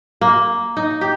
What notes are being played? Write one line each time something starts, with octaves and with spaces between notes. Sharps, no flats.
A#3
D#4
G4